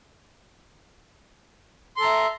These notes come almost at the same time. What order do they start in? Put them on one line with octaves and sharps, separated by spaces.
C6 A4 A#5 E5